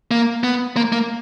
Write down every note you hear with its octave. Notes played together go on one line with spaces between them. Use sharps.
A#3
B3
A#3
A#3